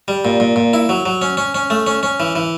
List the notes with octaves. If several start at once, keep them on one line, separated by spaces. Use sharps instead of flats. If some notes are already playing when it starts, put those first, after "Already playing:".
G3
A#2
A#2
A#2
E4
F#3
F#3
C#4
C#4
C#4
A3
C#4
C#4
E3
E3